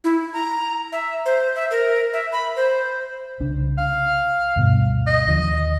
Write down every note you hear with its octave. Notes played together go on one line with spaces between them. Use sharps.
E4
A#5
E5
C5
E5
A#4
E5
B5
C5
C2 C#3 D4
F5
D2 G2 B2
D#5
D#2 D3 F3